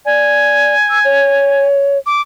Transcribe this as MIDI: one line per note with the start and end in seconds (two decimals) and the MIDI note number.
0.05 0.74 74
0.05 1.67 80
0.90 0.99 88
1.05 1.98 73
2.06 2.21 86